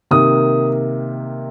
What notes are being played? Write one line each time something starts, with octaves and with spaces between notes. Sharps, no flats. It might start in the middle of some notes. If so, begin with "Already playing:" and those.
C3 D#3 A#3 D#6